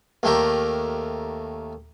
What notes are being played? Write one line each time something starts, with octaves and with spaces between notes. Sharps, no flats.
D#2 A3 G4 A#4